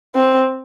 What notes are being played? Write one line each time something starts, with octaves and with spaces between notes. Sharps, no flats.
C4